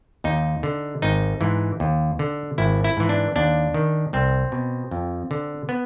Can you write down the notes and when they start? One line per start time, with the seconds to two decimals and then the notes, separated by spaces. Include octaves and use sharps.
0.24 D#2 D#4
0.63 D3
1.02 G#1 D#4
1.41 G#2 E3
1.80 D#2
2.19 D3
2.58 G#1 E4
2.84 E4
2.97 G#2 E3
3.09 D4
3.36 D#2 D4
3.74 D#3
4.13 C2 C4
4.52 B2
4.91 F2
5.31 D3
5.69 B3